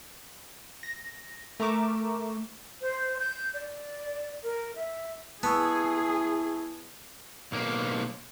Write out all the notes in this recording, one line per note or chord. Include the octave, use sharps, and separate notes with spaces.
A#6
A3 A#4 A#5 C#6 D6 E7
C5
G6
D5
A#4
E5
B3 E4 G#4 A5 C#6 E6
B1 A#3